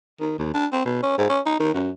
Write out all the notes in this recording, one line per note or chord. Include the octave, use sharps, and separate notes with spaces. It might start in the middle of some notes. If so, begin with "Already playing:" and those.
D#3
D#2
D4
C4
B2
C#4
G#2
C#4
D#4
D#3
F#2